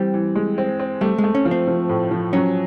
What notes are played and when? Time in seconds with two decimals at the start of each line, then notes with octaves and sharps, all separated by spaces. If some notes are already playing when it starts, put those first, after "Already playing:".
Already playing: E3 G3 C4
0.14 E3
0.36 G#3
0.58 C4
0.80 C4
1.01 G3 A3
1.18 G#3
1.24 A3
1.35 C#4
1.45 F3
1.51 C4
1.68 F3
1.89 A2
2.11 F3
2.33 F#3 C#4